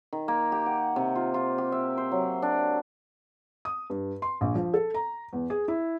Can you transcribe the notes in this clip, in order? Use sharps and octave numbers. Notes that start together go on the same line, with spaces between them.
D#3
A#3
G4
F#5
C3
F4
F4
G4
E5
C5
F#3
D4
D#6
G2
C6
A#1
F3
A4
A#5
E2
G#4
E4